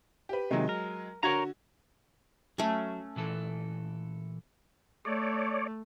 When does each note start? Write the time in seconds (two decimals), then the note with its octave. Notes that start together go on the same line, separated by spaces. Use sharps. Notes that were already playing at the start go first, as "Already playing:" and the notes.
0.29 G4 B4
0.51 C3 D#3 F#3 G#3
0.69 A#4
1.23 D3 F#4 A#4 C#5 A#5 G#6
2.58 F#3 A3 C#4
3.16 A#2 E3 A4
5.05 A3 C#5 D5